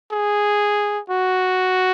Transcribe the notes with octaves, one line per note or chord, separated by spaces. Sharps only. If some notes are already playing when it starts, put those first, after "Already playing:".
G#4
F#4